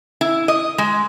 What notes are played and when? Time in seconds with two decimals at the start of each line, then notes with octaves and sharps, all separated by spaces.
0.21 E4
0.48 D#5
0.78 G#3